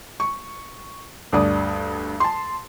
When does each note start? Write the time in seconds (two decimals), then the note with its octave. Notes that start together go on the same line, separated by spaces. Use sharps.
0.20 C#6
1.33 D2 G2 D5 D#6
2.20 A5 C6